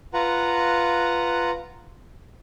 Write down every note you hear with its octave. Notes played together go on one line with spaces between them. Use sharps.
F4 B4 F#5 A#5